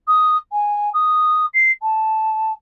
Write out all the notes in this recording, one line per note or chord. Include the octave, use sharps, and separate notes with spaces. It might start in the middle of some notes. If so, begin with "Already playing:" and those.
D#6
G#5
D#6
C7
A5